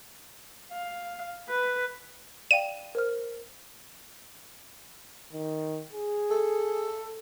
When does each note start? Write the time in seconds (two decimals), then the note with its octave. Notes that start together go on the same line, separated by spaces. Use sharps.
0.72 F5
1.49 B4
2.51 D5 F5 G5 D#7
2.95 A#4 C5 F6
5.33 D#3
5.93 G#4
6.31 A4